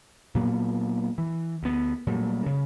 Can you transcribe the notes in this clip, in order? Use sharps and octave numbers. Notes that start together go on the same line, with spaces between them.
A#2 F#3 A#3 B3
E3
D2 B3
A#2 F#3 G3 A3
C#3